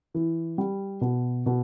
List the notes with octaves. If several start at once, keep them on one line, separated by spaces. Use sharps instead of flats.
E3
G3
B2
B2